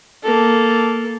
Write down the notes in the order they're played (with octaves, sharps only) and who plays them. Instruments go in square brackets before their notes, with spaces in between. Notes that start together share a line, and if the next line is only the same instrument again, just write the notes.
[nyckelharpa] A#3 A4